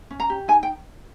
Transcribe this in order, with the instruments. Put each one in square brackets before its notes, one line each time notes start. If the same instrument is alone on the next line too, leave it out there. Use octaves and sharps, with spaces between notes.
[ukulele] C#4
A#5
G4
D#4 G#5
G5